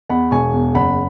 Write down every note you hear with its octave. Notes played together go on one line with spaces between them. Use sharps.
E2 F#5 B5
E1 G#5 C#6
E2
F#1 F#5 B5